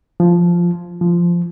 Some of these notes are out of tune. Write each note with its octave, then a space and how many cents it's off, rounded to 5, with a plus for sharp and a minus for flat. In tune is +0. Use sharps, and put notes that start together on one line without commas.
F3 -5
F3 -10